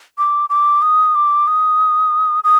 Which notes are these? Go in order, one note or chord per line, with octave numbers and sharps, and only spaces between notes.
D6
D6
D#6
D6
D#6
D#6